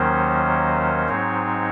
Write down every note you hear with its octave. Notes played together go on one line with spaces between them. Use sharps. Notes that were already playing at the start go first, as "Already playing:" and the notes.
Already playing: D#2 D#3 F#3 A#3 C#4 C5
G#2 F#3 C4 D#4 C#5